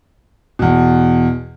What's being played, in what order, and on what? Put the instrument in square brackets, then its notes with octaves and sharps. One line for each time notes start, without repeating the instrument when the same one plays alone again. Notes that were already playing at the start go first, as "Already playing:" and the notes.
[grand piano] E2 B2